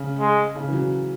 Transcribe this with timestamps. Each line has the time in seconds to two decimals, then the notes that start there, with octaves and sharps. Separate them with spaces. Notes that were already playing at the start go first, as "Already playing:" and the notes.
Already playing: C#3
0.19 G#3
0.55 C#3
0.68 E3
0.73 F#3